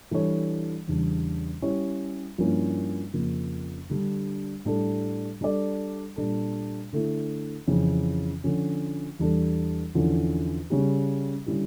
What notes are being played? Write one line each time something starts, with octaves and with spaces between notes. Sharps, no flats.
E3 G3 D4 A4 C#5
E2 C#3 G3 D4
G3 C#4 E4 G4 C#5
G2 F3 A#3 C#4 E4
F2 C#3 F3 A#3
D3 G3 D4
A2 G3 D4 A4
G3 D4 A4 D5
A#2 G3 D4 A4
D3 A3 E4
F2 C#3 E3
D3 F3 C#4
E2 E3 G3 D4 A4
E2 D3 F3 C#4 E4
C#3 G3 C#4 G4
D3 G3 C#4 E4 G4